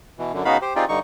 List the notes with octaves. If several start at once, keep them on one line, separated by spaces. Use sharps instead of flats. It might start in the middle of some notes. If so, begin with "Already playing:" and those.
B2 E3
F#2 D3
C#3 B3 D#4 F#4 F5 B5
G4 C5
C4 D#4 F4 G4 G#4 D5
G2 D3 D#4 C#6